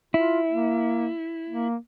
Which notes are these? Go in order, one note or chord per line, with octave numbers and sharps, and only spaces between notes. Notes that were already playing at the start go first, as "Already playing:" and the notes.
E4 F4
A#3
A#3